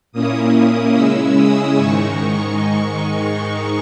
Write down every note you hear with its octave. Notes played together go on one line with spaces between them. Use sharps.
A#2 A#3 C#4 E4 D#6
C#3 G#3 C#4 E4 E6
D#6
G#2 D#3 G#3 D#4 C#6